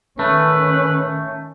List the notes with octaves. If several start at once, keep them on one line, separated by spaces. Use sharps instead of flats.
D#3 A3 C#4 B4